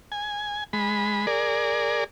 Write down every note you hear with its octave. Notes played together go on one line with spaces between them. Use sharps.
G#5
G#3 B5
G#4 A#4 D5